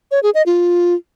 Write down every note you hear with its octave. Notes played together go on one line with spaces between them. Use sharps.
C#5
G#4
D#5
F4